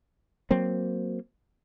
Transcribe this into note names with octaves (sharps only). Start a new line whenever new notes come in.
F#3 A#3 C4